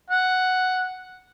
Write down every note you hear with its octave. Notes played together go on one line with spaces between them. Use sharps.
F#5